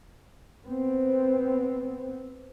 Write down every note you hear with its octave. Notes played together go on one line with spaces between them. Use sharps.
B3 C4